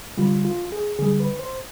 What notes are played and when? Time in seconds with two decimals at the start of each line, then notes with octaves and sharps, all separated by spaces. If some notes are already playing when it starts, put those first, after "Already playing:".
0.17 D3 G3 F4
0.45 F4
0.72 G#4
0.99 D3 G3 G#4
1.20 B4
1.39 C5